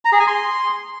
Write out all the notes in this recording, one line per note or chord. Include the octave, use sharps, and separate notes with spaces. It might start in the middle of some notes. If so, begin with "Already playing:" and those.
A#5
G#4
G#5
C6